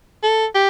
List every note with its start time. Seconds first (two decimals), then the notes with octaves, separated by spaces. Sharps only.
0.23 A4
0.55 G4